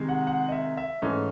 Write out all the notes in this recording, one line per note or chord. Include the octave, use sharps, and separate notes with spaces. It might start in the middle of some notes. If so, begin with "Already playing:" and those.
Already playing: C3 D#3 G#3
F#5
F#5
D#5
E5
E5
G#2 E3 A3 C#4 D#5